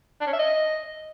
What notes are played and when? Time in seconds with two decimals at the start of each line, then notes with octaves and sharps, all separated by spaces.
0.21 D4
0.27 C#4
0.33 E5
0.39 D#5